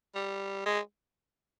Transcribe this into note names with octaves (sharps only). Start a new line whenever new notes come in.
G3
G#3